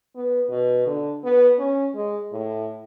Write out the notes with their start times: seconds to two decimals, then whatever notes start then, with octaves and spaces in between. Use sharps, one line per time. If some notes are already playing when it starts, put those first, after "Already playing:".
0.16 B3
0.50 B2
0.87 D3
1.24 B3
1.59 C#4
1.95 G#3
2.33 A2